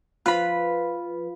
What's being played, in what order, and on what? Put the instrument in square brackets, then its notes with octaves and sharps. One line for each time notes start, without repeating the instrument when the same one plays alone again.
[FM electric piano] F3 B4 [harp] F4 B5